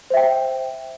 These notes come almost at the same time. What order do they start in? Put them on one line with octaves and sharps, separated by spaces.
C5 E5 G5